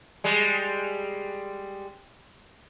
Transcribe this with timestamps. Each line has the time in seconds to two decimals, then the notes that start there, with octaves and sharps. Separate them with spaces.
0.24 G3 G#3